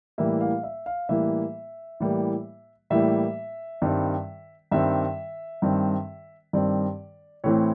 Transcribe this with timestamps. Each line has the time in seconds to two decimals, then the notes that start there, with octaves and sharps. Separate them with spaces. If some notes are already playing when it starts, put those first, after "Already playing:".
0.18 A2 E3 G3 A#3 E5
0.41 F5
0.63 E5
0.86 F5
1.09 A2 E3 G3 A#3 E5
2.00 A2 E3 G3 A#3
2.90 A2 E3 G3 A#3 E5
3.82 G2 D#3 G3 C4
4.71 G2 D#3 G3 C4 E5
5.62 G2 D#3 G3 C4
6.53 G2 D#3 G3 C4 D5
7.44 A2 E3 A3 C4 C#5